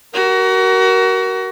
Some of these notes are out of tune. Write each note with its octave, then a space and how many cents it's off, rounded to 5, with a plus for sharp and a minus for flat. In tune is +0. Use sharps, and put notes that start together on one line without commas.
F#4 +30 A#4 +10